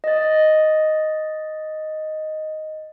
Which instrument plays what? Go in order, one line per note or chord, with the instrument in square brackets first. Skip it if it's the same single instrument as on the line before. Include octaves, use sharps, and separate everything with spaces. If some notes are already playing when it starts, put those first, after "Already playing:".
[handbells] D#5 A6